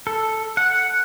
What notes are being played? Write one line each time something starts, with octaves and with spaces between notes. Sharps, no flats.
A4
F#5